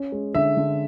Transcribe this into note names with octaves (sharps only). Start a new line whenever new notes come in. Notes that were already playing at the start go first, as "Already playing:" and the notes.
Already playing: C#4
G#3
D3 E5
D3